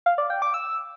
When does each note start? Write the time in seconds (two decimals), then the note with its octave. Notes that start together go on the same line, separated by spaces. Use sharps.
0.06 F5
0.18 D5
0.30 G5
0.42 D6
0.54 E6